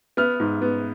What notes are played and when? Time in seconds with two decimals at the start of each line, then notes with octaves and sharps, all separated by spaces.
0.17 B3 F6
0.40 G#2
0.62 B3